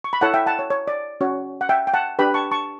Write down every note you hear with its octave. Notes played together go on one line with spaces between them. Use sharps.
C#6
B5
E4 A4 C#5 F#5 A5
E5 G5
F#5 A5
C#5
C#5
D5
C#4 F#4 C#5
F#5
E5 G5
G5
F#5 A5
D4 G4 B4 G5 B5
A5 C#6
A5 C#6